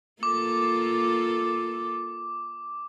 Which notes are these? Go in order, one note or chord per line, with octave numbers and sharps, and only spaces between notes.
A#3 F4 A4 D6